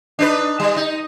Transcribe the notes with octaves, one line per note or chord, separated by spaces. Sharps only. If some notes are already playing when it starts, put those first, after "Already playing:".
D4 D#4 B4
G3
D#4